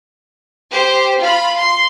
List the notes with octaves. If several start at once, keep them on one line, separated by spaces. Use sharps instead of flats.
G4 C5
F4 B5
C6